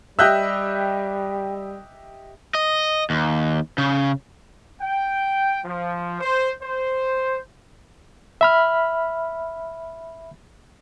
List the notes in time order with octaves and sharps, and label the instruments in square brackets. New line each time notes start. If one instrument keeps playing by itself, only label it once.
[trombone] G3 [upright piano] G4 D#5 E5 [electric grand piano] E6 F#6 G6
[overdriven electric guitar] D#5
D#2
C#3
[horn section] G5
F3
C5
C5
[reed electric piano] E5 B5 F6